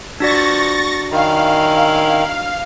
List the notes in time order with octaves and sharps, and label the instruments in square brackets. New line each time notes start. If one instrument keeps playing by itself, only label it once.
[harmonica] E3 F3 [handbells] D4 F#4 D5 [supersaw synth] C#6 A6 A#6
[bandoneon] D#3 [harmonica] C#4 E4 A#4 [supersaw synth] F5